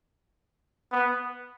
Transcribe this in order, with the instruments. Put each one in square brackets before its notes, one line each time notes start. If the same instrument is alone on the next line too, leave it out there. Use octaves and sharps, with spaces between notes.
[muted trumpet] B3